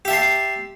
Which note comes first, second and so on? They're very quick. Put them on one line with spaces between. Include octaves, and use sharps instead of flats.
G4 E5 A5 C6